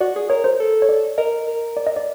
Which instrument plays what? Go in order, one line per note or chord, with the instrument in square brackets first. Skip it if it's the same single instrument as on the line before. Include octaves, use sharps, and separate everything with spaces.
[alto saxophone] F#4 [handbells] D5
[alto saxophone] G#4
[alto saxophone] A#4 [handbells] C#5
[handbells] C5
[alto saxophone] A4
[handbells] C#5
D5
[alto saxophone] A#4 [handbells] D#5
[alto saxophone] A#4
[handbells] D5
D#5
D5